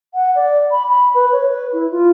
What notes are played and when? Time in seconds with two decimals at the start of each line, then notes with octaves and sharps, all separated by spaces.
0.14 F#5
0.36 D5
0.71 B5
0.88 B5
1.15 B4
1.32 C#5
1.48 B4
1.73 E4
1.91 F4